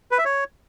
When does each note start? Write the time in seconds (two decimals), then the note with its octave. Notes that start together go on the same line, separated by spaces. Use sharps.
0.11 B4
0.18 E5
0.25 C#5